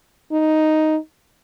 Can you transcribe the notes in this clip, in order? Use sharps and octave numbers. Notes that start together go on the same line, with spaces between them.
D#4